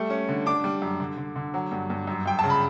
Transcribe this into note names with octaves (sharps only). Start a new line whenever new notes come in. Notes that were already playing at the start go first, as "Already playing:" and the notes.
Already playing: G3 A3
C#4
D3
D4 D6
G3
F#2
D3
D3
D3
F#3
G2
G2
F#2
F#2 G5
C#3 A5
B5